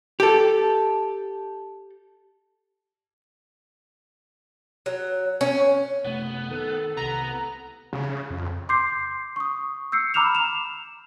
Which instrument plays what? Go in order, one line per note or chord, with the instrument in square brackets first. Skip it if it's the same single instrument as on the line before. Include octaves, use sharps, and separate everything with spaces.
[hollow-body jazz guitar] G4 A4
[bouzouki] F#3
C#4
[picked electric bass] F#1 C3 A3 [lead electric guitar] B3
[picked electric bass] D#3 [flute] A4
[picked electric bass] C2 C3 [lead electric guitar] B3 [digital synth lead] A#5
[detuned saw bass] C#3
F2
[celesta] C6 D6 G6 C7
C#6 D#6
E6 G6 C7 C#7
A#5 B5 D6 F6 E7 F7
E7 F7